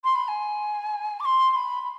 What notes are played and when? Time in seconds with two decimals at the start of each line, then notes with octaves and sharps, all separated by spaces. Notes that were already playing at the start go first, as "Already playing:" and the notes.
0.04 C6
0.15 B5
0.28 G#5
1.20 D6
1.25 C6
1.51 C6
1.55 B5
1.82 B5